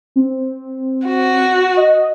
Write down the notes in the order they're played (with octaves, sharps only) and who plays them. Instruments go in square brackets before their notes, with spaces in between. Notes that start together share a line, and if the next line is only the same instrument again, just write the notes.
[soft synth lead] C4
[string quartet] F#4
[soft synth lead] D#5